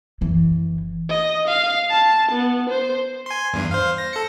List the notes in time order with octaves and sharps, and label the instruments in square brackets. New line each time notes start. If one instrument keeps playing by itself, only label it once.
[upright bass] F#1 E3
[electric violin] D#5
F5
A5
B3
C5
[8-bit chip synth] G#5 C6
E2 G2
C5 F5
A#6
A4 A#6 C#7